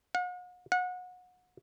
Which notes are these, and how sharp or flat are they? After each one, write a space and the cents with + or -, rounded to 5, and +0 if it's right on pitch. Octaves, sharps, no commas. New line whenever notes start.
F#5 -45
F#5 -30